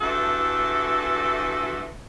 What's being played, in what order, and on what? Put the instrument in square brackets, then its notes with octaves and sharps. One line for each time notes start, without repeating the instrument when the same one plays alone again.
[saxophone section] G2 E3 A3 F#4 A4